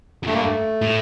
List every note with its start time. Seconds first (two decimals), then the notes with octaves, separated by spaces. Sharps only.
0.23 F2
0.27 G2 A3
0.34 A#3
0.42 A3
0.81 A2